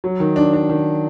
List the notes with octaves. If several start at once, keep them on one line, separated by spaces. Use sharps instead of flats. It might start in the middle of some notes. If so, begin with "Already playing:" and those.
F#3
D#3
D4
D4
D#3